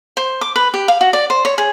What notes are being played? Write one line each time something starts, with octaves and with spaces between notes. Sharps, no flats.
C5
D6
B4
G4
F5
F#4
D5
C5
C#5
G#4